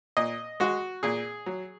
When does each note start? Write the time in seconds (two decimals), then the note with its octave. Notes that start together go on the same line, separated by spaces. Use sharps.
0.17 A#2 D#5
0.60 G#3 F#4
1.03 A#2 G#4
1.46 F#3